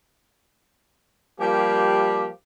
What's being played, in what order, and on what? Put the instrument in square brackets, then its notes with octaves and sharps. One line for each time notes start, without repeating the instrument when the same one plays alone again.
[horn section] F3 G3 A#3 G4